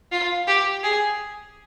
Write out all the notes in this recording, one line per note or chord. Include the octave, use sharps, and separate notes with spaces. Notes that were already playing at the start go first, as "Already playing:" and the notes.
F4
G4
G#4